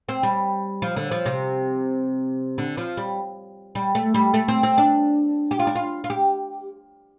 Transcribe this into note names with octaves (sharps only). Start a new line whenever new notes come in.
C4
G3
F3
D3
F3
C3
D3
F3
G3
G3
A3
G3
A3
C4
C4
D4
G4
F4
D4
F4
F4
G4